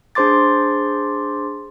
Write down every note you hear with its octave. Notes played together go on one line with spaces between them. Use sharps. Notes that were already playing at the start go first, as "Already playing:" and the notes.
D4 G#4 C5 C6 D6 A6